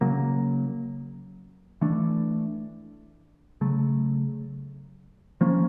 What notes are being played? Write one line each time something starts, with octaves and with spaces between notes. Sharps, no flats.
C#3 F#3 A#3
E3 A3 D4
C#3 F#3 A3
F3 A#3 C#4